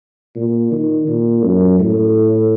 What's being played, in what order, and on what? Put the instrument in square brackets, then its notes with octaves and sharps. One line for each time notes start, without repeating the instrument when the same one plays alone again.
[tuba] A#2
D#3
A#2
F#2
A2